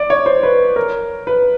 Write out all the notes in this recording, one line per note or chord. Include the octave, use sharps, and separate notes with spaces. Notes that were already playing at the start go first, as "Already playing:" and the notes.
Already playing: D5
C#5
C5
B4
A#4
B4